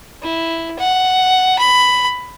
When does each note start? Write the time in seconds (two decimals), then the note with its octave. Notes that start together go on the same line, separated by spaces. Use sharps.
0.22 E4
0.79 F#5
1.59 B5